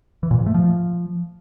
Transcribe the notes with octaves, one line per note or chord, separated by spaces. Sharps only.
E3
A#2
G#2
A3
F3